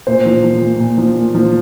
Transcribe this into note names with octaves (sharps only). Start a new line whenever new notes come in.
A#2 C5
F3
F3
A#2
A#2
F3
A#2
F3